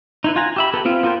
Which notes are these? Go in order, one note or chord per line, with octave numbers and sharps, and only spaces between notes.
D#4 E4 B4
F4 F#5 G#5 A#5
G4 E5 B5
B3 G4 A4 B4
B3 C4 F4
B3 F4 A#4 C5 G5